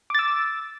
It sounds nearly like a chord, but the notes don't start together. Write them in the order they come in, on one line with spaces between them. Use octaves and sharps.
D6 A6 E6